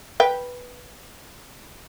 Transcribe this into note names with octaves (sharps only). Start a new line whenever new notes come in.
B4 G5